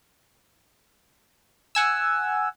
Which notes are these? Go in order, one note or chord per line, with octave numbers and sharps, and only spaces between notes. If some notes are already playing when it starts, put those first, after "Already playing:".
F#5 G#5 E6